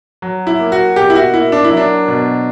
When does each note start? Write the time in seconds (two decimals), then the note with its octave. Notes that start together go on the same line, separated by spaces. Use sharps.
0.22 F#3
0.47 E4
0.59 A#3
0.72 F#4
0.96 B2 G4
1.10 E4
1.15 F#4
1.34 A#3 E4
1.52 D4
1.64 E4
1.71 F#3
1.77 D4
2.08 B2